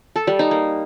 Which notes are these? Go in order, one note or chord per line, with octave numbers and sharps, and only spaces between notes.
A4
G3
D#4
A#3